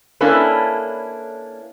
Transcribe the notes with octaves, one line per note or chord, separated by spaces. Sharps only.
A#3 C#4 D4 E4 A4 B4